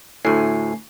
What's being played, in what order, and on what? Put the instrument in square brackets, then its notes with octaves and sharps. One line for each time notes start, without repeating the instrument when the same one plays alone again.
[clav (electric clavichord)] D2 A2 [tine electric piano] A3 G#5 C7